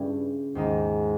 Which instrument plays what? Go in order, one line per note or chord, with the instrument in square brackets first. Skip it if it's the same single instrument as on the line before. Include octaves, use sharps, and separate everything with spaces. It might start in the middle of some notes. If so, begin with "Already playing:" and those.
Already playing: [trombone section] G2 [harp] C#3 G3 C#4 E4
[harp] D#2 D#3 G#3 D#4 [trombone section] G#2